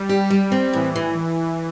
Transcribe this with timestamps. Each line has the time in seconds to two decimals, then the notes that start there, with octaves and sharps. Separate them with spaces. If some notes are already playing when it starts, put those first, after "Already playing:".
Already playing: G3
0.09 G4
0.30 G3
0.52 C4
0.73 A2 E3
0.96 E3